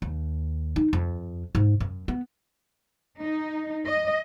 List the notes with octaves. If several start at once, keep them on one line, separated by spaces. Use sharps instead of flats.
D#2
D#4
F2
G#2
F#2
B3
D#4
D#5